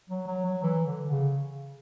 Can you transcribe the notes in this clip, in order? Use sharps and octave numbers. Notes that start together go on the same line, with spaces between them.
F#3
F#3
F#3
E3
D3
C#3